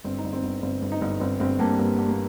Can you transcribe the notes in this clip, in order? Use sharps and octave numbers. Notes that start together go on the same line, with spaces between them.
G1 C4
D#4
G1
C4
G1
G1 C4
G1
D#4
G1
G1 C4
G1 C4
G2 A#3
G2 A#3
G2
A#3